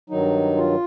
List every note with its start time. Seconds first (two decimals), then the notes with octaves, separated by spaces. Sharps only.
0.10 G2 D#3 F#3 D#4
0.57 F4